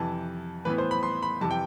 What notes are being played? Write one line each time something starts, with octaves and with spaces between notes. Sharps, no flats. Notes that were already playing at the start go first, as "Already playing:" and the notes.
Already playing: F2 C3 E3 A5
A2 E3 B3 B4
C5
B5
C6
B5
F2 C3 E3 A5
G5